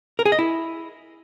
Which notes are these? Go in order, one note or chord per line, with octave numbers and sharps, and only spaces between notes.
A#4
G#4
D#5
E4